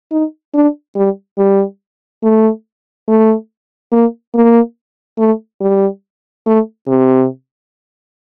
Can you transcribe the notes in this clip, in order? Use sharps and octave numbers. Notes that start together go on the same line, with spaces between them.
D#4
D4
G3
G3
A3
A3
A#3
A#3
A3
G3
A3
C3